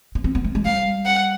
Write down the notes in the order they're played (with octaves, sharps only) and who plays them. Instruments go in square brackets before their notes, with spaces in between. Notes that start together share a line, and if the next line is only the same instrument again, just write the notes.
[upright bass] B3
C4
B3
A3
G#3
[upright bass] G3 [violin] F5
[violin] F#5